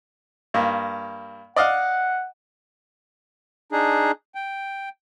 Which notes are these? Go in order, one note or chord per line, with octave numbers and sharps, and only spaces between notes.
G2 A#3
D5 D#5 F5 F#5
D4 D#4 G#4
G5